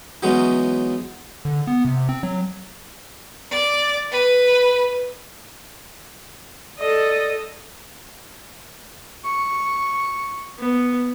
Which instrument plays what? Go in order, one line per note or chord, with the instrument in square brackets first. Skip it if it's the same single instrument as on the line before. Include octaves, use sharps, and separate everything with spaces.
[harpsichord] E3 F#3 G#3 B3 C#4 D#4
[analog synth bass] D3
B3
C3
C4
F#3
[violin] D5
B4
[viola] A4 D#5 [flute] D5
[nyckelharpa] C#6
B3